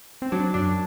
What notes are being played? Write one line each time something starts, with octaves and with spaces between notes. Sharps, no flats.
C4
F#3 D4
F#2 D4